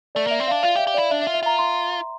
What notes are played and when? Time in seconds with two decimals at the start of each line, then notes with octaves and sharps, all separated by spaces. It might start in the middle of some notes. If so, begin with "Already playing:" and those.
0.15 A3 D5
0.27 A#3 E5
0.40 C4
0.48 D4 F5
0.63 F4 F5
0.75 G4
0.78 E5
0.87 G4
0.94 E4 D5
1.10 D4 E5
1.22 E5
1.27 F4
1.34 E5
1.43 F4 A#5
1.58 C6